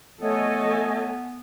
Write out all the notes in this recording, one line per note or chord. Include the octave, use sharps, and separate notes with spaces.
A3 B3 A4 C#5 D#5 G#5